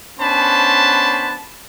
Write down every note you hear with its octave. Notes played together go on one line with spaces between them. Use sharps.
B3 C#4 D4 C5 A5 B5